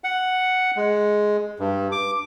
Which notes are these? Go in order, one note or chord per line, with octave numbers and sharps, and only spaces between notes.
F#5
G#3
G2
D6